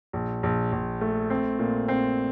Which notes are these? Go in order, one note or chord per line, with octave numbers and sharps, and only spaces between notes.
A#1
A#1
A#1
A3
C4
A#2
C4